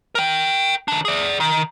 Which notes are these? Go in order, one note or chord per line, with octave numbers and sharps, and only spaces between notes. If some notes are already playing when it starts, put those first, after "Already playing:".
A#4 G5
D#3 D4
G#4 D5
D#3